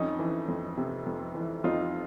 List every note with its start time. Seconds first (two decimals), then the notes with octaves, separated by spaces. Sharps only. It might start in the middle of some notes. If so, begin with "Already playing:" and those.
Already playing: F2 C#4 D#4
0.19 E3
0.48 F2
0.77 C3
1.06 F2
1.35 E3
1.64 F2 D#4 F4